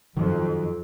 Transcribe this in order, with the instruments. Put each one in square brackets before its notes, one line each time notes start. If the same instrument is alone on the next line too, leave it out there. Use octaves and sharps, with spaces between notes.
[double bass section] F2 [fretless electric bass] D#3 F#3